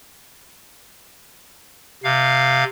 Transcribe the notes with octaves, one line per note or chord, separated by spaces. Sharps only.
C3 F5